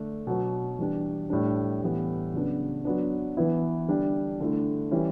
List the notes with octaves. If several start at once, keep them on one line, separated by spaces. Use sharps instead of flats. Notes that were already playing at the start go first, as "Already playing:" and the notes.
Already playing: D3 A3 D4
B2 F#3 B3
E3 G3 D4
A2 G3 D4
A2 E3 G3 B3
C#3 F#3 B3 D4
F#3 B3 D4
E3 B3 E4
D3 G3 D4
D3 A3 E4
E3 G3 C#4 E4